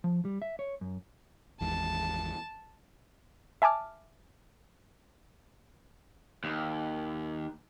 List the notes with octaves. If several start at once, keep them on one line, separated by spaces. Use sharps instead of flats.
F3
G3
E5
C#5
F#2
G#1 E2 G#2 A5
E5 G#5 A5 D6 F6
D#2